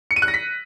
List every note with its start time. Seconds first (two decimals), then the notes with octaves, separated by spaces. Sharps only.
0.11 C#7
0.16 D#7
0.22 F#6
0.28 A#6
0.34 B6